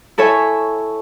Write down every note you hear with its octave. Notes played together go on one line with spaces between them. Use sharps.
E4 A4 C#5 E5 G#5